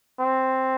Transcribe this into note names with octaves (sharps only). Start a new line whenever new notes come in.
C4